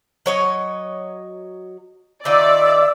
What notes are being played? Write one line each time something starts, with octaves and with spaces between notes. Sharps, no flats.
F#3 C#5 D#5
D#3 D#4 F4 D5 E5 D6 E6